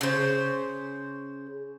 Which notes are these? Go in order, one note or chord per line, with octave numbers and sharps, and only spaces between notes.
C#3 C5